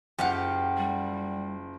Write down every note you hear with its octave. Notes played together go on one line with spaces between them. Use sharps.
F#1 F4 G4 F5 F#5
G3